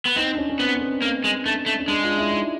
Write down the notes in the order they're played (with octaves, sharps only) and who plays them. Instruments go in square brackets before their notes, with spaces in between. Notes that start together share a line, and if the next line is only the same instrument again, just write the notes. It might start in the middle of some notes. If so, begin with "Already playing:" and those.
[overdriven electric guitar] B3
[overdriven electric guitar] C4 [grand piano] D#4
[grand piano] D4
C#4
C#4
[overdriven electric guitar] B3 [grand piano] C4
[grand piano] C4
B3
[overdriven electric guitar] A#3 [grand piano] C#4
[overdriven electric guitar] G#3
[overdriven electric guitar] A3 [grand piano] D4
[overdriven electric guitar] A3
[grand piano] C#4
[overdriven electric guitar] G#3 [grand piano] D4
[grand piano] F4
E4
D#4